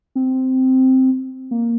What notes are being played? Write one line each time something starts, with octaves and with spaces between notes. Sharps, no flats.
C4
A#3